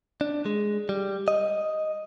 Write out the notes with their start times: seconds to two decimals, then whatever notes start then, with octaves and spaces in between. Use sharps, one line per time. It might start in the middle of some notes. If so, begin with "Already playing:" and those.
0.21 D4
0.46 G#3
0.89 G3
1.28 D#5